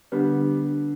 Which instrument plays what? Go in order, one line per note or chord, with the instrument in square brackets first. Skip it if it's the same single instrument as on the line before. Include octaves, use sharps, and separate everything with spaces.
[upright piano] D3 G3 B3